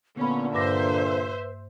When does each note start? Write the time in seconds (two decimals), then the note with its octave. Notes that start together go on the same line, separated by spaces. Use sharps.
0.17 A#2 D3 A#3 B3 C#4 B5
0.54 G2 B4 C5 E5 D6 A#6